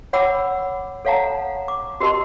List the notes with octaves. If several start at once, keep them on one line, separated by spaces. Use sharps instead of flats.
C#5 F#5 B5 D6 E6
A4 C#5 F5 F#5 A5 A#5
D6
F#4 G4 A#4 D#5 A5 C6